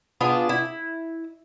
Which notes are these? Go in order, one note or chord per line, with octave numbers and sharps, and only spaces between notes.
B3 D4 F4 G#4
E4